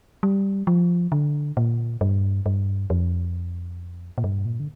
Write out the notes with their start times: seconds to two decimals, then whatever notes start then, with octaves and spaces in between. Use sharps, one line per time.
0.23 G3
0.67 F3
1.12 D3
1.57 A#2
2.01 G2
2.46 G2
2.90 F2
4.18 A#2
4.24 G2
4.45 A#2
4.60 D3